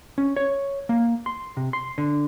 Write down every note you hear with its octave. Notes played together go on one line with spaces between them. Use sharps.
C#4
C#5
A#3
C6
C3
C6
D3